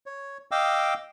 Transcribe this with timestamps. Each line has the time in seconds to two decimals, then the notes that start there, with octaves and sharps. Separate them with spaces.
0.06 C#5
0.51 D#5 F5 G5 D6 E6